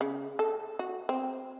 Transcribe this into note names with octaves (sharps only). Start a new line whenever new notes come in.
C#3
A4
F#4
C4